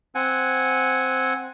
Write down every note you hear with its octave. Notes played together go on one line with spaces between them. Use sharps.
C4 F#5 G#5